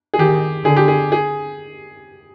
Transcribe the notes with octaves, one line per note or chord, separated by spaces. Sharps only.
G#4
D#3 G4
D3 G#4
G4
G#4
G#4